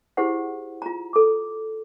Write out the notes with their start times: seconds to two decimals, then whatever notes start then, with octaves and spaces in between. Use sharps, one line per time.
0.17 E4 G4 G#4 C5 F#5
0.82 F4 A#5
1.13 A4 D6